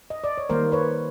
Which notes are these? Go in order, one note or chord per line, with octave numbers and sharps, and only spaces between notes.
D#5
D5
C#5
D#3 G3 A#3 A#4 C5
B4 C#5